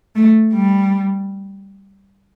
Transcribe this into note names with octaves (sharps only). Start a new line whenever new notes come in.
A3
G3